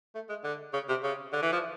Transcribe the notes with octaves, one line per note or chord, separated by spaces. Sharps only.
A3
G#3
D3
C#3
C3
C#3
D3
E3
F3